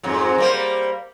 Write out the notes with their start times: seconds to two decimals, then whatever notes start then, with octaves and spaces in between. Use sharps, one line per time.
0.03 F2 G#2 F#3
0.38 G3 A#3 C5